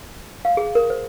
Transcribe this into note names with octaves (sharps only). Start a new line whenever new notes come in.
F5
G#4
A#4
C5